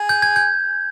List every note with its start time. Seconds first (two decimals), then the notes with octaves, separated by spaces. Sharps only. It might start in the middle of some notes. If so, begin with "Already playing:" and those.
Already playing: G#4
0.09 G6
0.22 G#6
0.36 G6